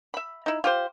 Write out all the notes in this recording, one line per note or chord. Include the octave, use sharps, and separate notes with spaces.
E5 B5
D#4 E4
F4 G4 C5